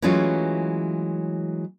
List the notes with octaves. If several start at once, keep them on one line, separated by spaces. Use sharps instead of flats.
E3 F#3 G#3 A3 C#4 F4